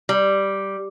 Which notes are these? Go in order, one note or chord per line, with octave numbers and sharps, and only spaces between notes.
G3